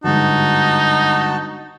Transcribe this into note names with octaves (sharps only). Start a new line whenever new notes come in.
G1 G#2 D#4 F#4 A5